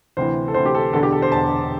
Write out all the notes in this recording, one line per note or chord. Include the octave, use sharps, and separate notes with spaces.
D2 C3 E3 C5
A4
D2 C3 E3 C5
G4
A4
E1 E2 D3 A4
G4
A4
C5
E1 E2 D3 A5